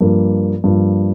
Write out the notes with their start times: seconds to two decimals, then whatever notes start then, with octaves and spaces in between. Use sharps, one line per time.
0.01 G2 F3 A#3
0.64 G2 F3 A#3